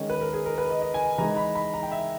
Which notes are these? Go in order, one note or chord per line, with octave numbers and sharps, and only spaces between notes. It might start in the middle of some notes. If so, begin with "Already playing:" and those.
Already playing: D#3 G#3 C#4 D#5
B4
A#4
G#4
A#4
B4
D#5
D#5
G#5
E3 G#3 D#4 A#5
B5
B5
A#5
G5
E5